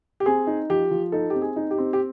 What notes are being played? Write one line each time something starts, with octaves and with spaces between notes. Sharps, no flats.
G4
C4 G#4
D#4
F3 G4
F3
D#4 A4
C4 G4
G#4
D#4
G4
C4
G4